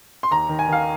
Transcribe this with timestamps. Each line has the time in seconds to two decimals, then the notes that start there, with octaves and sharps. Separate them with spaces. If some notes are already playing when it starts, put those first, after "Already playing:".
0.23 C6
0.31 D#2 A#5
0.49 D#3
0.59 G#5
0.68 D#3 F5